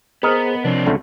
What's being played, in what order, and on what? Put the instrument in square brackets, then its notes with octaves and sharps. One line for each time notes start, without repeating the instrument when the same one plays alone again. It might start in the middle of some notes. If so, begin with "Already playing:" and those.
[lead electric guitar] B3 [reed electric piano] G#4 C5 [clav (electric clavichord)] A#4 D#5
[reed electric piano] C3 F3 [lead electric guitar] C4 D4
[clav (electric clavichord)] C#2 D3 A3